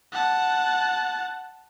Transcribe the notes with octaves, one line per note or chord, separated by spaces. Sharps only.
F#5 A5